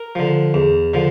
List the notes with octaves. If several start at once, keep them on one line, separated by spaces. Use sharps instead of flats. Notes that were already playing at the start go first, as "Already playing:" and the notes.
Already playing: A#4
D3 F3
E2
D3 F3